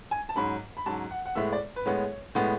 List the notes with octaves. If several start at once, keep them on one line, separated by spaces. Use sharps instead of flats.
G#5
A5
G#2 F#3 C#4 B5
B5
G#2 F#3 C#4 A5
F#5
F#5
A2 G#3 B3 E5
D5
B4
A2 G#3 B3 C#5
A2 G#3 B3